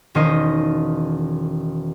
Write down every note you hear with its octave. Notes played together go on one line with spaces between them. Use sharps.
E1 D#3 C#4 C5 D#5